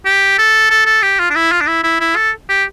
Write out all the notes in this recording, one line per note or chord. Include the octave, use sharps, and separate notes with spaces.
G4
A4
A4
A4
G4
F4
D4
E4
F4
D4
E4
E4
E4
A4
G4